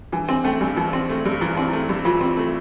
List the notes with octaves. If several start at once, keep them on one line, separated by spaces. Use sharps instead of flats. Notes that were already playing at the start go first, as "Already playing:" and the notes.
E3 D4
C4 D4
A3 C#4
G2 D4
E3 D#4
C4
A3
G2
E3 E4
C4 D#4
E4
A3
G2
E3 F4
C4
A3